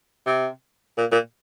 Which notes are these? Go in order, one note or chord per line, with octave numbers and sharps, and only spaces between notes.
C3
A#2
A#2